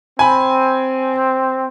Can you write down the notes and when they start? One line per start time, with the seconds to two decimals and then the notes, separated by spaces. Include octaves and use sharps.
0.19 C4 G#5 B5